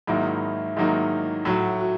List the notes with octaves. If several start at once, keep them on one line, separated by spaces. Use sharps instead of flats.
G#2 D#3 F#3 A#3 D#4 E4
G#2 D#3 F#3 A#3 D#4
A2 F#3 A3 F#4
F#4